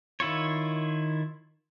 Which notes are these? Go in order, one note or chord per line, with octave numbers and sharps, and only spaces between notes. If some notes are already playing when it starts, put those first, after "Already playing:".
D#3 E4 F4 C#5